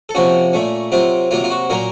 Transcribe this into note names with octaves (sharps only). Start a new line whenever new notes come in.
A4
C3 F3 A#3 C#4 F#4
A#2 A3 C#4
C3 F#3 C4 F4
C3 F#3 A#3 F4
F4
F#4
A#2 F#3 A#3 C#4 A#4